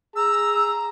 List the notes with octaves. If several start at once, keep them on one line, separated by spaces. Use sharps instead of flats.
G#4 A#5 E6